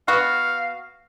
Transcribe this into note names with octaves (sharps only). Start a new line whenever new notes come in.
B3 F#4 F5